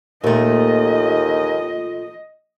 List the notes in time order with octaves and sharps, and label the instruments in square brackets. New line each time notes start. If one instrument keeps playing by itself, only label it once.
[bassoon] D#2 [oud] A#2 A3 [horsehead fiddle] D#5